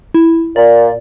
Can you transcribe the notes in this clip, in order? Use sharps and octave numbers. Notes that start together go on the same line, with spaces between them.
E4
A#2 D5